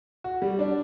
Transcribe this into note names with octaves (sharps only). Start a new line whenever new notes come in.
F#4
G3
D4